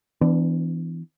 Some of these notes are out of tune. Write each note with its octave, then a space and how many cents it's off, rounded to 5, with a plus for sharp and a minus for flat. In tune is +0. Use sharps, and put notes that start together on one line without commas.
E3 +5 B3 +45 D4 +15